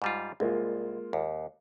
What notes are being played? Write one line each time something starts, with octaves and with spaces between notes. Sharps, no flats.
G#2 G3 F4
C2 G#3 A#3 F4
D#2